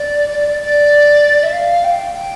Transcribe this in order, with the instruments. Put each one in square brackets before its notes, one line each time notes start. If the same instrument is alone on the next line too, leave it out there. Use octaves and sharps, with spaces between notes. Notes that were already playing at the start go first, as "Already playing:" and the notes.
Already playing: [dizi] D5
D5
E5
F5
G5
G5